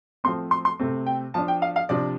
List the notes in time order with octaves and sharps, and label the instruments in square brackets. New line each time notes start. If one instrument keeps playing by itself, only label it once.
[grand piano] F3 A3 C4 C6
C6
C6
C3 A3 C4
G5
F3 D4 A5
G5
F5
F5
C3 F3 D4 D5